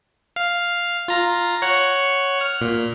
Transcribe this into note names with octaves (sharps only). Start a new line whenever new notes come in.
F5
F4 A#5
C#5 F#5
F6
A#2